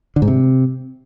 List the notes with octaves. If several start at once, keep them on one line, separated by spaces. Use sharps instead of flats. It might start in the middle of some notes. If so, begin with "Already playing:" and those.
D3
G#2
C3